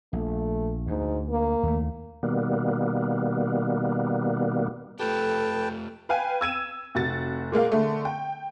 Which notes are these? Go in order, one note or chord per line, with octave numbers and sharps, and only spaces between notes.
A#1 A3
D2 G#2
A#3
D#2 A3
B2 D#3 G3 A#3 B3
A3 F4 G4 A4 B4 G5 A5
B4 F5 G5 G#5
E6 G#6 D#7 E7
F1 F#4 A6
A#2 G#3 A#3 F5
D3 G#3 A3
G5